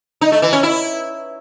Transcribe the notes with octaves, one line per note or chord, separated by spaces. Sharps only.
D#4
A3
E3
C#4
E4